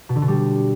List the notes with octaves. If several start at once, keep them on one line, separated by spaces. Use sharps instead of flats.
B2
D3
B2
G3